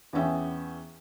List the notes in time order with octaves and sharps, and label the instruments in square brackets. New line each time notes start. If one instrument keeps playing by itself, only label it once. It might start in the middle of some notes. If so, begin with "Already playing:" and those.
[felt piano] E2 B3 C#4 E5 G5